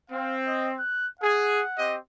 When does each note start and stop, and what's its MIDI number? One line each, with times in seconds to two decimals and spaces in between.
0.10 0.77 60
0.10 0.35 77
0.47 0.69 75
0.79 1.08 90
1.21 1.61 68
1.21 1.88 78
1.78 1.96 60
1.78 1.96 67
1.78 1.96 75